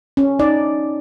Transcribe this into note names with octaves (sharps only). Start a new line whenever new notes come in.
C#4
D#4 D5